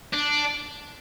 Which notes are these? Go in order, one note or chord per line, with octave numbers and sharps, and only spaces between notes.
D4